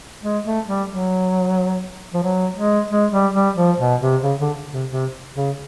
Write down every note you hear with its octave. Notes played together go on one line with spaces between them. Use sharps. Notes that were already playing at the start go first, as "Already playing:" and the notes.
G#3
A3
G3
F#3
F3
F#3
G#3
G#3
G3
G3
F3
B2
C3
C#3
D3
C3
C3
C#3